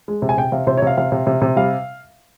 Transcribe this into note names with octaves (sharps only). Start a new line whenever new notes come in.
G#3
C3
G#5
C3 G5
C3 F5
C3 C5
C#5
C3 F5
C3 F5
C3
C3
C3
G3 F5